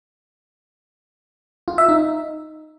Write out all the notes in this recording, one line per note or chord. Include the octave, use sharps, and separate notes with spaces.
F4
E5
D#4